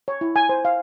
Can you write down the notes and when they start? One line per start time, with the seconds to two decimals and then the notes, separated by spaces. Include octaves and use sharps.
0.08 C#5
0.21 E4
0.36 G#5
0.49 C5
0.65 F5